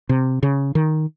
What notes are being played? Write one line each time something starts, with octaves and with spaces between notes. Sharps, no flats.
C3
C#3
D#3